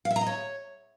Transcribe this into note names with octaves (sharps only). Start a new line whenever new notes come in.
F5
E5
A#5
D#5
C#5